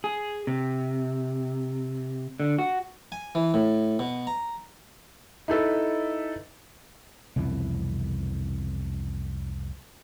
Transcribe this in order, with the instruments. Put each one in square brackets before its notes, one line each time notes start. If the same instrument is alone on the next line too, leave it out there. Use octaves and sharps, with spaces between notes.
[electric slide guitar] G#4
C3
D3
F#4
[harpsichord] G#5
E3
A2
B2
A#5
[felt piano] D#4 E4 A4 B4
[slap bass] C2 F2 B2 E3